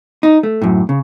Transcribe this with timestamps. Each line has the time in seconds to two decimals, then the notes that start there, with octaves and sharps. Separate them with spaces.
0.23 D#4
0.43 A3
0.62 F#2 A2
0.89 C#3